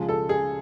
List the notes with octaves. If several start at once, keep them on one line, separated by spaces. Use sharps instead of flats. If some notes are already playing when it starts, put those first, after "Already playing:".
Already playing: C#2 C#3 F3 G#3
A4
G#4